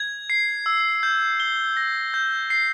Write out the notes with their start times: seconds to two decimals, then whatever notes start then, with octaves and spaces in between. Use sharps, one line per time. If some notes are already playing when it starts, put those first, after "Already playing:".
Already playing: G#6
0.30 C7
0.66 E6
1.03 G6
1.40 G7
1.77 A#6
2.14 G6
2.50 C7